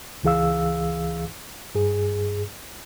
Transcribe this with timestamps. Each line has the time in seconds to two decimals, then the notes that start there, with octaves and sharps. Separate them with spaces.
0.23 C#2 E3 G#4 F5 E6
1.75 G2 G#4